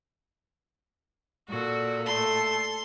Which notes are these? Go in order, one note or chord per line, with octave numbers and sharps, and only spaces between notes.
A#2 F#4 A4
A3 A4 C6